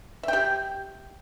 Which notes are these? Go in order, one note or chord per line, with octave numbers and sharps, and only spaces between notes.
G4 E5 G5